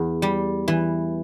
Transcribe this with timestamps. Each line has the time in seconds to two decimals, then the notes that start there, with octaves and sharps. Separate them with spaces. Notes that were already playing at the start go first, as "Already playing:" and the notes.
Already playing: E2
0.22 G3
0.68 E3